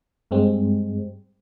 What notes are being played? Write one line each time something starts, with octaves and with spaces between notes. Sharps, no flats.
G2 G3 G#3 C4